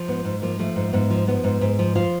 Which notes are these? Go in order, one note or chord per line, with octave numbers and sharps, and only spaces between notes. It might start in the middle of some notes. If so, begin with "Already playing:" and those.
Already playing: F3
G#2 B3
G#2
F3 A#3
F3 A3
G#2
G#2 B3
F3
F3 B3
G#2
G#2
F3
F3 F4